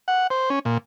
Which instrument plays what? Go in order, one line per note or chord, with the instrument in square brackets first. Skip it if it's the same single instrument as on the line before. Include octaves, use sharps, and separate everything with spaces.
[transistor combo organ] F#5
C5
C#4
A#2